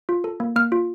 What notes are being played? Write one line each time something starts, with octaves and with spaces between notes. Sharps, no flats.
F4
A4
A#3
A#3 F6
F4